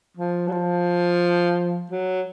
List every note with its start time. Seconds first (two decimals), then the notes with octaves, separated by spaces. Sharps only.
0.17 F3
0.48 F#3
0.52 F3
1.91 F#3